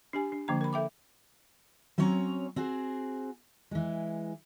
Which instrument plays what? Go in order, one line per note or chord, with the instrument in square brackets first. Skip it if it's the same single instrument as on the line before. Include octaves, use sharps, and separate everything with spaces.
[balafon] D4 G4 G#5
D4
D3 F3 A#3 D4 A#5
A#4 B5
A4 E5 G5 D6
[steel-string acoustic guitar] F#3 C4 C#4 C#5 A#5
C4 F#4 G#4
E3 G#3